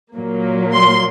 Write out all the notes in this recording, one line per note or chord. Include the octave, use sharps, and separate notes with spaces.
A#2 F#3 A#3
C6